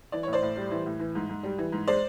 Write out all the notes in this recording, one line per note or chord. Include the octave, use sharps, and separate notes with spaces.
E3 D5
A2 C#5
C5 D5
A2
G3
E3
A2
E3
G#2
G#2
G3
E3
G#2
G#3 C5 D5